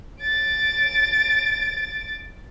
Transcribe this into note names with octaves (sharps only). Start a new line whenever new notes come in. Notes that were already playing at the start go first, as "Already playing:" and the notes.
A6 D7